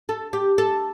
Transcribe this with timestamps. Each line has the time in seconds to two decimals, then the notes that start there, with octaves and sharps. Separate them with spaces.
0.09 A4
0.33 G4
0.58 A4